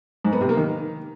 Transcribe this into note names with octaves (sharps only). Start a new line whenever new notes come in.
G#2
B3
C3
A#3
D#3